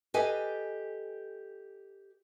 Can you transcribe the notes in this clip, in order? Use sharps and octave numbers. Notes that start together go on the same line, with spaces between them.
G4 A4 B4 D#5 F5 G#5